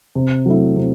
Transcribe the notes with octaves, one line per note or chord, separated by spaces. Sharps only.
C3
F#3 A3 E4
C3